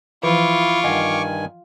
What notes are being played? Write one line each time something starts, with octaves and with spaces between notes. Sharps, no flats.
E3 F3 E4 F4 C#6 D6
G2 D#3 D#5 F#5 G#5